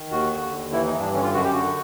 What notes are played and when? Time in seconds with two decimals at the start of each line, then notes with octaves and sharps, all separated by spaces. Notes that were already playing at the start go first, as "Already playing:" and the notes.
Already playing: D#3
0.11 D#2 F#4
0.31 D3
0.52 D#2
0.72 E3 E4
0.86 D#4
0.93 G2
1.00 D4
1.13 D3 C#4
1.23 F4
1.34 F#2 F#4
1.44 G4
1.54 D3 F#4